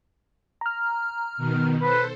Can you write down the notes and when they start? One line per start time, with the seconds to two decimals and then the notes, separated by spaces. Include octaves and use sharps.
0.61 A#5 F6
1.37 B2 D#3
1.81 A4 B4 C5